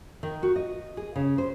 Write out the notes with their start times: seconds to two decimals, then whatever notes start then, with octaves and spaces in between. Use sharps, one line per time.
0.23 D#3
0.43 F#4
0.56 D#5
0.97 G#4
1.16 C#3
1.38 C5